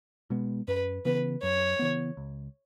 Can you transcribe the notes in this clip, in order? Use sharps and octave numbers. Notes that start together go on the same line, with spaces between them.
B2 G#3 B3
F#2 B4
C#3 E3 B3 B4
F#2 C#5
C#3 E3 B3
C#2